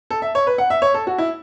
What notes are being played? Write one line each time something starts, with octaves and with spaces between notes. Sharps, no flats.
A4
E5
C#5
B4
F#5
E5
C#5
A4
F#4
E4